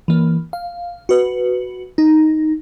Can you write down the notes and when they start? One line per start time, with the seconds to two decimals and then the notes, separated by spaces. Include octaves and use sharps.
0.08 E3 A#3
0.53 F5
1.09 F#4 B4
1.98 D#4